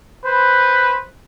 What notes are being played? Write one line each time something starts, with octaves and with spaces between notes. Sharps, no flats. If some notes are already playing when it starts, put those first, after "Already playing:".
B4 C5